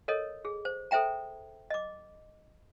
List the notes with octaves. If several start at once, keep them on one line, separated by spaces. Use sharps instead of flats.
A4 A#4 C#5 D#5
G#4
C5
A4 C5 E5 G5 A#5
D#5 D6